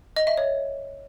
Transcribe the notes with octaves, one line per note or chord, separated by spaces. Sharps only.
D#5
E5
C#5